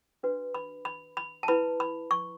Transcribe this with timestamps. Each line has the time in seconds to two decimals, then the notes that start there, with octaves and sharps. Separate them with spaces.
0.23 D4 F#4 B4
0.54 B5
0.85 B5
1.17 B5
1.43 A5
1.48 E4 B4 B5
1.80 B5
2.11 C#6